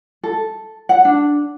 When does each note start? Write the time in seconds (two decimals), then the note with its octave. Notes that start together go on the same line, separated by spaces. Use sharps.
0.23 A4
0.89 F#5
1.05 D4